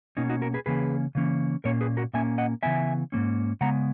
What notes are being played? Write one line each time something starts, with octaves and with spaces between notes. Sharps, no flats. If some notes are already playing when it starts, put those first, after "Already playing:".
B2 A#3 C#4 D#4
D#4 F#4
F#4 A#4
G#4 B4
C#3 E3 A#3 C#4 G#4 B4
C#3 E3 A#3 C#4
A#2 A#3 C#4 A#4 C#5
G#4 B4
F#4 A#4
A#2 A#3 C#4 E5 G#5
D#5 F#5
C#3 E3 B3 E5 G#5
G#2 D#3 A#3 C#4
C#3 G#3 B3 F#5 A#5